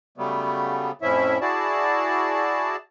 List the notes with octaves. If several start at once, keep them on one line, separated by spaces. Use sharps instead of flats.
C#3 F#3 G3 A3 B3
F2 A2 F3 C#4 E4 E5
E4 F#4 G#4 D5 A5